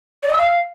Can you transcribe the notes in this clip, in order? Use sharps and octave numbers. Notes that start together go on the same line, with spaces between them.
D5
D#5
E6
F5